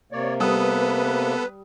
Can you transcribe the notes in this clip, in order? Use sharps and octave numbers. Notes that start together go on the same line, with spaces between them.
C3 A#3 C#5 D5
G3 B3 A4 B4 D#6